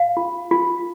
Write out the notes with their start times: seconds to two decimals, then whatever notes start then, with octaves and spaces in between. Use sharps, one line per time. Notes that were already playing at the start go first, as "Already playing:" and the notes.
Already playing: F5
0.17 F4
0.51 F4